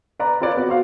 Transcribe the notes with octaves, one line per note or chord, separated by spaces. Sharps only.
B4 D5 A#5
C4 F4 B4 C#5 D5
B3 F#4
F#4 C5 F5